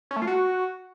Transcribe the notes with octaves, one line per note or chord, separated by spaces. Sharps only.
C#4
A3
F4
F#4